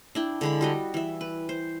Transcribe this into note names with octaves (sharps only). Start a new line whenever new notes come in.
D4 E4 G5
D3 G#3 B5
G3 F#4 D#5
E3 E5
B4
C5